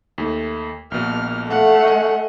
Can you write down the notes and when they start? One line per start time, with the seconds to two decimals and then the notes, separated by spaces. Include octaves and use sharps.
0.18 D#2 A3
0.92 A#1 B2 A#3 F6
1.50 A3 F5 F#5
1.86 D#5 G#5